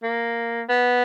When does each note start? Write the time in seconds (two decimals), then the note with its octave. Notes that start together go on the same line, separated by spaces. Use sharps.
0.03 A#3
0.69 B3